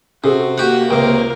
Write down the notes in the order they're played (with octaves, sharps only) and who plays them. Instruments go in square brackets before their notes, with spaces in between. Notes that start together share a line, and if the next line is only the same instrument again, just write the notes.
[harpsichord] C3 [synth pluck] C#4 G#4 A4 [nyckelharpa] F#4
[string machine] A#3 [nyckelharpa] F#4 [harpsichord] G4 F#5
[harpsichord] C#2 C3 [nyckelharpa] A#4 [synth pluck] G5